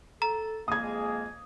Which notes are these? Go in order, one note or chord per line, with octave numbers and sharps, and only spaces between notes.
A4 A#5
F2 G#3 A#3 G#4 D#6 G#6